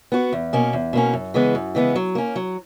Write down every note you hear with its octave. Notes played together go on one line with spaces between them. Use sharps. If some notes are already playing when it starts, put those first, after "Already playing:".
B3 F#4
E2
B2 A#3 C#4
E2
B2 A#3 C#4
F#2
C#3 E3 G#3 B3
F#2
C#3 E3 G#3 B3
F#3
A#3 C#4
F#3